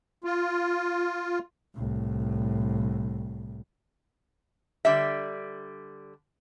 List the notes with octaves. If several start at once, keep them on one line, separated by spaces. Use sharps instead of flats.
F4
C2 A2
D3 G3 E5